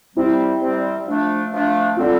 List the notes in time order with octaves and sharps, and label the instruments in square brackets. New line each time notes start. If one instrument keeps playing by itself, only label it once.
[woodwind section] C3 G3 C4 [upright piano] E4
[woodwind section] C3 G3 C4
F3 A3 D4
F3 A3 D4
[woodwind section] D3 G3 C4 [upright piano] F4